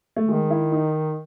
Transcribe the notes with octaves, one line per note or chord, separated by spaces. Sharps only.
A3
D#3 G#3
E4
D#4